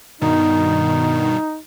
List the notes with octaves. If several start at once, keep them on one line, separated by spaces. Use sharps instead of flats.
G2 B2 D#3 D#4